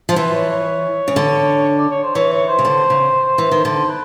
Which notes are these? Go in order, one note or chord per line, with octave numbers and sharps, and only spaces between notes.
F3
E3 C5
C#5
C#5
C#3
D3
D5
C#5
C5
E3 C#5
C#5
C5
C#3
D3
C#3
E3
D#3
D3 C5
B4